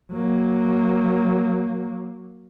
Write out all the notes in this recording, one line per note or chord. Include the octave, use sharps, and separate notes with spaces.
F#3 A#3